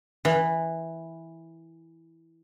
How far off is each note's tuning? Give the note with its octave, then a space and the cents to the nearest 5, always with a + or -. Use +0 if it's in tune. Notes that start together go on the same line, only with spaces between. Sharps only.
E3 -5